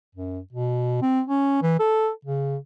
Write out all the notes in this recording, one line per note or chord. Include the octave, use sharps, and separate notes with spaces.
F#2
B2
C4
C#4
E3
A4
C#3